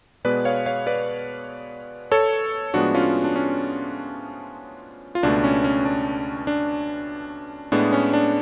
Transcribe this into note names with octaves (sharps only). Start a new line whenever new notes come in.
B2 G#3 B3 B4 D5
C#5 F5
C#5 F5
B4 D5
A4 C#5
A2 F3 G#3 B3 D4 F#4
C#4 F4
D4
C#4
F4
C#2 B2 A3 D4
C#4
C#4
D4
D4
A2 G#3 B3 D4
C#4
D4